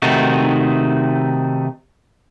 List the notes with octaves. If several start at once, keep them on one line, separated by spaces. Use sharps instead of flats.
C3 D#3 A3 D#4 F#4